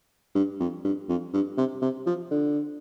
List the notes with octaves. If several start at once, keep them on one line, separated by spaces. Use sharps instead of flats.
G2
F2
G2
F2
G2
C3
C3
F3
D3